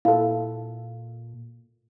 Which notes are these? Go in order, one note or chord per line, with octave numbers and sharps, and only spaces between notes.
A#2 E4 A4 F5